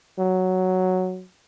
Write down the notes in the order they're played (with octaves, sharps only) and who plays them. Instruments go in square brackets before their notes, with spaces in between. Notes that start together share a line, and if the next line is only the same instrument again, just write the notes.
[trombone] F#3